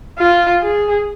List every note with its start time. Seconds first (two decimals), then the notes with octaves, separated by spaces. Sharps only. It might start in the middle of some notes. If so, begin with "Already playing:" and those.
0.19 F4
0.62 G#4